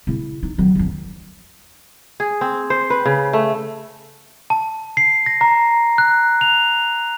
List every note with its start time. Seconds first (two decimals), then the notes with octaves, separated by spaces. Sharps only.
0.07 C#3 E4
0.43 D#4
0.58 D#3 F#3
0.75 F#1 F2
2.20 G#4
2.41 C4
2.70 C5
2.90 B4
3.06 C#3
3.33 A3
4.50 A5
4.97 C7
5.26 A#6
5.41 A#5
5.98 F#6
6.41 F7